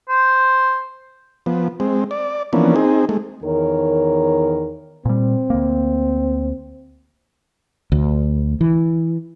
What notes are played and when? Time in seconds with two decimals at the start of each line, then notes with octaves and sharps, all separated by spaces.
0.09 C5
1.46 F3 B3
1.80 G#3 C4
2.11 D5
2.53 E3 F3 A#3 B3 C#4 D4
2.76 C4 D#4 G#4
3.09 G#3 A3
3.43 E2 D#3 A#4 C#5
5.05 A#2 G3 C4
5.50 D2 A#3
7.92 D2
8.61 E3